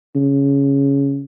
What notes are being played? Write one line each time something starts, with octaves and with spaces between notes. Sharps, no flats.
C#3